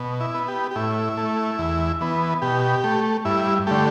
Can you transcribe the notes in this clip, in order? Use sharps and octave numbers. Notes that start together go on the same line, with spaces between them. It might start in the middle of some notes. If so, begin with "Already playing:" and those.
Already playing: B2
E4
B3
G4
G4
A2 E4
A3
E2
E3 B3
B2 G4
A3
G2 E4
D3 A3 G4